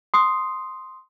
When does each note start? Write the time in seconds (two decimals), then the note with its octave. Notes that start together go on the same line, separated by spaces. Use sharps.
0.14 C6 D#6 C7